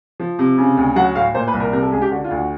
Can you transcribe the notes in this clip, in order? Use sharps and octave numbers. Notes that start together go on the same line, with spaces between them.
F3
C3
C#3
D2
F#3 F#5
A2 F5
A#2 C5
B4
C2
A#4
C3 A#4
A4
C#2 G#4
G4
D3 F#4
F4
D2
F#4